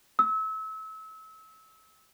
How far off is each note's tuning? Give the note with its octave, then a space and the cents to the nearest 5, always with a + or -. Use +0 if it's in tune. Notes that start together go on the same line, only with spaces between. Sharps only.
E6 -30